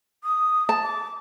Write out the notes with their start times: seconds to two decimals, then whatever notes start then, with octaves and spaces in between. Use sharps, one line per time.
0.24 D#6
0.69 A5
0.84 D6